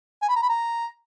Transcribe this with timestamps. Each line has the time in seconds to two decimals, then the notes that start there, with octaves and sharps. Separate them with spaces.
0.22 G#5
0.29 B5
0.36 A#5
0.42 B5
0.49 A#5